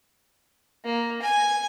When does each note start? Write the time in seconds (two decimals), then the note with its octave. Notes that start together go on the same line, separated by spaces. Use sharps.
0.84 A#3
1.22 G#5